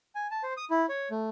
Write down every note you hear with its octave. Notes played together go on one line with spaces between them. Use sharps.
G#5
A5
C5
D#6
E4
C#5
A3